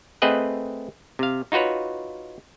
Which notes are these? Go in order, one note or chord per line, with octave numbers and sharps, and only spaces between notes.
A3 C4 G#4 B4 D#5 F#5
C3 F5
D#4 F4 F#4 B4 C#5